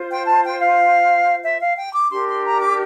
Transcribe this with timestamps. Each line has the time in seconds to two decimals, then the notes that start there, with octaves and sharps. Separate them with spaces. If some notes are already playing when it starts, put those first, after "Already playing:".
Already playing: F4 C5
0.11 G5
0.27 A5
0.44 G5
0.60 F5
1.44 E5
1.61 F5
1.77 G5
1.94 D6
2.10 D4 G4 A#4 C6
2.28 C6
2.45 A#5
2.61 D6